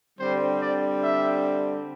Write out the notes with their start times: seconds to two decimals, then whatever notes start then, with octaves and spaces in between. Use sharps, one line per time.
0.19 D3 G3 C4 C5
0.60 D5
1.01 E5